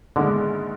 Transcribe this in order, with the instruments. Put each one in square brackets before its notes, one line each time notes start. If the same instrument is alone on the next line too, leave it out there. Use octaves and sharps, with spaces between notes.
[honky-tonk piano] A#1 G#2 D#3 G#3 B3 [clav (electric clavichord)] D3